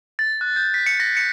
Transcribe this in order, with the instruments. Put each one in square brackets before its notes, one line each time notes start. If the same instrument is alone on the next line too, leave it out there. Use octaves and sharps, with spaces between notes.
[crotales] A6
F#6
G6
B6
C#7
A#6
C#7